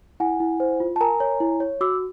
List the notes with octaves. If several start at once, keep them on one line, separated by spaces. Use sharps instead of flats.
E4 F#5 G#5
E4
C5
F4
A5
A#4 G#5 A#5
C#5
E4
C#5
F#4 D6 E6